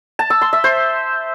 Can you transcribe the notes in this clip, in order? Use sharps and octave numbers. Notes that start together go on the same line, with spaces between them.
A5
E6
C6
E5
C5